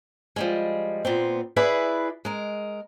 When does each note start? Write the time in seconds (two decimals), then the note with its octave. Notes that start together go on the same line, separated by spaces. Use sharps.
0.36 F3 G3 G#3
1.05 A#2 B3 C4
1.56 E4 G#4 B4 D5 E5
2.25 G#3 A#4